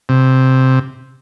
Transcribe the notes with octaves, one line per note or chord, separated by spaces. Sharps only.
C3